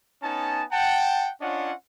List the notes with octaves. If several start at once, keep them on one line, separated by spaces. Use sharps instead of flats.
B3 C#4 D#4 G#5 A5
F#5 G5 A5
C#4 D4 F4 C#5 D#5 F#5